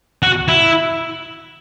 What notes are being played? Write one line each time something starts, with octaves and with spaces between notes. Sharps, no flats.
F#4
E4